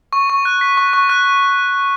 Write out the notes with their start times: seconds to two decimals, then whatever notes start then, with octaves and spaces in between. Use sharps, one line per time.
0.13 C#6
0.30 C#6
0.45 F#6
0.61 B6
0.77 C#6
0.93 C#6
1.09 F#6